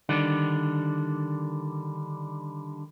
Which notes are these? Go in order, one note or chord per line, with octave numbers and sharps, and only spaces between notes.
D3 D#3 G3 D4